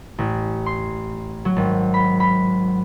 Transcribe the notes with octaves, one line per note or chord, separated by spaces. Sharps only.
A1
C6
F#3
G#1
B5
B5